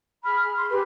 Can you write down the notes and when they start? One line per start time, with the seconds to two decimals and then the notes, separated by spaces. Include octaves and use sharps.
0.24 G#4 B5 F6
0.56 C6
0.71 G4 G#4 B4